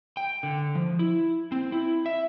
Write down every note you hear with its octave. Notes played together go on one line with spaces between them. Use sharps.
G5
D3
F3
E4
C4
E4
E5